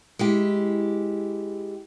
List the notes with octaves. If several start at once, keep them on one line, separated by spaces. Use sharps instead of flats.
G#3 E4 G4